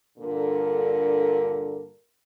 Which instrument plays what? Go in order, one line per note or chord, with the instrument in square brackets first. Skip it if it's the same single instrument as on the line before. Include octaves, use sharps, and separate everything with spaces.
[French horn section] G2 A#2 D3 A4 A#4